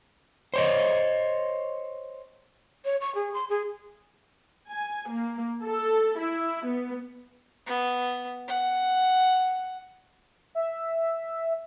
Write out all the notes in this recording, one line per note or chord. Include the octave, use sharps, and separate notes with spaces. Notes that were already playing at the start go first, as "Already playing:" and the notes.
C5 C#5 D#5
C#5
C#6
G#4
C6
G#4
G#5
A#3
A4
E4
B3
B3
F#5
E5